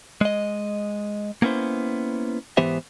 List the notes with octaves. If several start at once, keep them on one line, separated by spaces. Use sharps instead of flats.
G#3 D#5
A#3 B3 C#4 E4 C5
G#2 E3 B3 G4 C5 E5